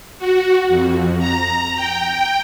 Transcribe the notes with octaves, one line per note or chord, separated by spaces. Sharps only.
F#4
F2
A#5
G5